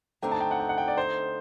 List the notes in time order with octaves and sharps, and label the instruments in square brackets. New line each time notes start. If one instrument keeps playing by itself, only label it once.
[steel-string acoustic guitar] D3 A3 C4 D#4 [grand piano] G5
[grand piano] A5
G5
F#5
G5
F#5
G5
D5
C5